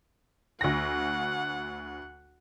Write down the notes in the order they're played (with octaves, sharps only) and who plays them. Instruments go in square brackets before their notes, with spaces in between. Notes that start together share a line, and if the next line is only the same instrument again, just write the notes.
[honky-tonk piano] D2 A#6 [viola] F#5